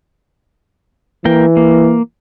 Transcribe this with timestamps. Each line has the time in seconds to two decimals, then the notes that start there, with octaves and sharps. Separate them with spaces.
1.25 E3 A#3 A#4 G5
1.57 A#3